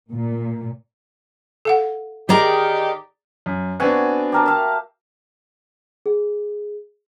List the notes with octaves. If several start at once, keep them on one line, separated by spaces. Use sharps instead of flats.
A#2
A4 F5 F#5
D#3 G4 G#4 D5 A#5
F#2
B3 C4 D4 F#4 F#5 G#5
G4 A#4 A5
E5 F5 A5
G#4